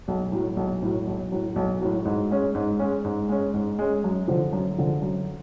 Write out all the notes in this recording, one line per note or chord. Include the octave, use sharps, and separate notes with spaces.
B1
A2 F#3
B1
A2 F#3
B1
A2 F#3
B1
A2 F#3
G#2
G#3 C#4
G#2
G#3 C#4
G#2
G#3 C#4
G#2
G#3 C#4
F#2
D3 F3
F#2
D3 F3
F#2